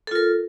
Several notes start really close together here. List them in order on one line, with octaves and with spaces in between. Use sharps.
A4 F4 A#4